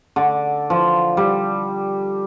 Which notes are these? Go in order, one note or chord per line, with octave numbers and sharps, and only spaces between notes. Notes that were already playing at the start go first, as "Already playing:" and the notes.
D3
F3
G3